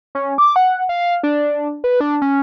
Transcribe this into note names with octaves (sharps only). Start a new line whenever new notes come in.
C#4
D6
F#5
F5
D4
B4
D4
C#4